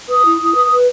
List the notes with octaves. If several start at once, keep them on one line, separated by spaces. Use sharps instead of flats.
B4 D#6
E4
E4
B4
B4